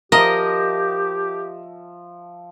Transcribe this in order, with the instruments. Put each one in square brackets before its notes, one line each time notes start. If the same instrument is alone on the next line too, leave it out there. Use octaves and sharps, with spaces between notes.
[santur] F3 E5 [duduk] G4 [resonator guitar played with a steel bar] A#4 [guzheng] D#5